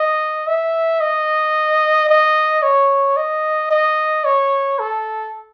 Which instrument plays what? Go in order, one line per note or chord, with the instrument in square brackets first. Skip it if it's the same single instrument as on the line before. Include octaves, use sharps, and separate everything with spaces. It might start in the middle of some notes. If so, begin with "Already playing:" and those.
Already playing: [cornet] D#5
E5
D#5
D#5
C#5
D#5
D#5
C#5
A4